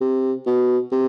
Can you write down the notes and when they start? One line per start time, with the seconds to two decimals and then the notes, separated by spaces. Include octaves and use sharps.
0.01 C3
0.47 B2
0.92 C3